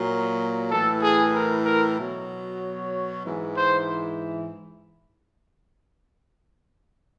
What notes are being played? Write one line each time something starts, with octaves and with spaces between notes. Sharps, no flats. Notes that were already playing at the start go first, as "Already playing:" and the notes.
Already playing: A#2 F#3
A2 E3 A4
G#4
A#4
A#4
B2 F#3
C#5
G#2 E3
C5